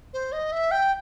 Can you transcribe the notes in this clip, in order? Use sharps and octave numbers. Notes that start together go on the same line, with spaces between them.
C5
D#5
E5
G5